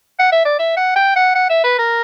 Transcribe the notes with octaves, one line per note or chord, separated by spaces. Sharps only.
F#5
E5
D5
E5
F#5
G5
F#5
F#5
E5
B4
A#4